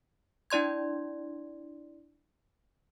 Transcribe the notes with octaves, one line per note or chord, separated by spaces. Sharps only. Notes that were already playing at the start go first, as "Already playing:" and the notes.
D4 E4 D5 C6 G#6